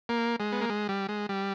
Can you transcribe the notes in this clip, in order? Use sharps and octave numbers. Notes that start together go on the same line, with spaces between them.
A#3
G#3
B3
A#3
G#3
G3
G#3
G3